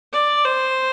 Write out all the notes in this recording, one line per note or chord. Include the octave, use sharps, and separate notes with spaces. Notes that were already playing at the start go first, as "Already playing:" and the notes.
D5
C5